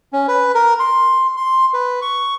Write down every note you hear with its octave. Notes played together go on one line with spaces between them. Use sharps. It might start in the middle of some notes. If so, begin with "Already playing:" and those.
C#4
B4
A#4
C6
C6
B4
C#6